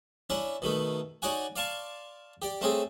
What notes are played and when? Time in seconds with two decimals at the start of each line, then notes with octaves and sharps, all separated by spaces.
0.30 C#4 D4 E4
0.62 B2 D#3 A3
1.22 D#4 F#4 C#5 D5 F#5 G#5
1.56 D5 F5 A5 C6 C#6
2.42 G4 D5
2.61 A3 C4 C#4 G#4 A4